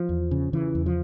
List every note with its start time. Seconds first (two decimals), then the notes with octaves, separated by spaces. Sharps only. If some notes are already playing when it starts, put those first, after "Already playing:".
Already playing: F3
0.09 E2
0.31 C#3
0.53 C#3 E3
0.75 E2
0.86 F3